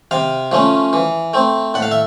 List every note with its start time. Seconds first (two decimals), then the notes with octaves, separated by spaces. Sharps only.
0.11 C3 F5
0.52 F3 A3 C#4
0.93 E3
1.34 A3 C4
1.74 A2 F#5
1.82 F5
1.91 E5